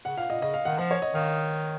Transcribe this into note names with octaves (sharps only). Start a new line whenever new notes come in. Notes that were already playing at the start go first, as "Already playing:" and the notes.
C#3 F#5
A#2 F5
A#2 D#5
C#3 D#5
F5
D#3 F#5
F3 F#5
C#5
D#5
D#3 F5